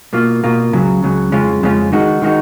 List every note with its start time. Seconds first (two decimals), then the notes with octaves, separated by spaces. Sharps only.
0.13 B2 A#3 F4
0.44 B2 A#3 F4
0.73 C#2 C#3 F#3
1.03 C#2 C#3 F#3
1.32 F2 C#3 G#3 C#4 F4
1.63 F2 C#3 G#3 C#4 F4
1.92 D#3 G#3 D#4 F#4
2.22 D#3 G#3 D#4 F#4